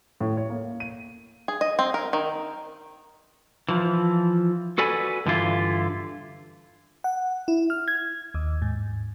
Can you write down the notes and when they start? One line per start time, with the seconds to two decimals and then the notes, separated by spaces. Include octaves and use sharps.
0.21 A2
0.37 C#5
0.50 A#3
0.80 D#7
1.48 G#4
1.61 D#5
1.79 C4
1.94 A#4
2.13 D#3
3.69 E3 F3
4.78 F#4 A4 B4 D5 G#5
5.26 G2 D3 E3 E4 F4
7.04 F#5
7.48 E4
7.70 F6
7.88 G#6
8.34 D#2
8.62 G#2